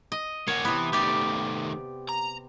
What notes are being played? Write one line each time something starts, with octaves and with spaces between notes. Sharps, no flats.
D#5
A#3 F#4 C#5
C3 E3 B3
D#3 A3 G4 D5
A#5